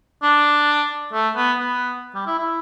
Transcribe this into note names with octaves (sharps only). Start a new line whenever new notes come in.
D4
A3
B3
B3
G3
E4
E4